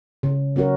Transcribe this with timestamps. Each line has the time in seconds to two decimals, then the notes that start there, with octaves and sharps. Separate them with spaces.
0.23 C#3
0.56 F#3 C#4 F#4 A#4